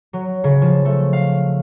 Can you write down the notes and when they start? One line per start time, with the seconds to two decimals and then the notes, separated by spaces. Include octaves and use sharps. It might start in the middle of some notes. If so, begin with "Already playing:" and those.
0.13 F#3
0.44 C#3
0.62 F3
0.85 A3
1.13 F5